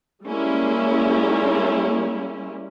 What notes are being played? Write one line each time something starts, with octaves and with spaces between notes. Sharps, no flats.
G3 G#3 A#3 C#4 E4